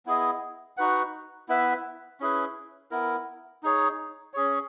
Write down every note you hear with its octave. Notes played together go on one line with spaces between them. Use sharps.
B3 E4 G#4 D#5
D#4 F#4 B4 F#5
B3 E4 B4 E5
C#4 E4 G#4 B4
B3 E4 A#4
D#4 G#4 C#5
C#4 G#4 C#5